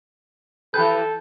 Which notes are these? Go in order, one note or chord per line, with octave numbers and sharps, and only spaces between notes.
E3 G4 A4 B4 G6